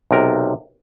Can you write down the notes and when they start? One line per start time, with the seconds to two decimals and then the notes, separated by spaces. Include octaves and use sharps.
0.11 B1 C3 A#4